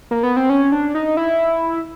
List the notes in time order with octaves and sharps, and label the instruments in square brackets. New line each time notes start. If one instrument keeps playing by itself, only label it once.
[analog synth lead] A#3
B3
C4
C#4
D4
D#4
E4